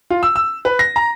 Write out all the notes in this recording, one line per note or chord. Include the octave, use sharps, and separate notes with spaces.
F4
E6
E6
B4
A#6
A#5